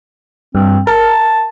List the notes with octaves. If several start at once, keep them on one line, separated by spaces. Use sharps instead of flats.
G2 C4
A#4 A5